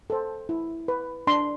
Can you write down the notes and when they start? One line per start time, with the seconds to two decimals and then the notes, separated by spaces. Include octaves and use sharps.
0.10 A4 C5
0.49 E4
0.88 B4
1.27 D4 C6